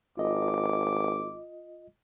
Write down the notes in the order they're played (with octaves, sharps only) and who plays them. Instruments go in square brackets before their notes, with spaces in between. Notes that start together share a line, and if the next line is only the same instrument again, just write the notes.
[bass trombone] G#1 [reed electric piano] F4 D#5 [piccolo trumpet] D6